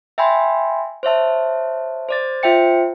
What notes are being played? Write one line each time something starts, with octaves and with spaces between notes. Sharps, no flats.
E5 G5 G#5 B5 C6
C5 C#5 E5 A5
C5 D5 A6
F4 C5 E5 G5 C#7